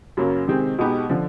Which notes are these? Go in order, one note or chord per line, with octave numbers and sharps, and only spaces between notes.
F#2 C#3 F#3 A#3
C3 D#3 G#3 C4
B2 G#3 B3 D#4 G4
D3 F3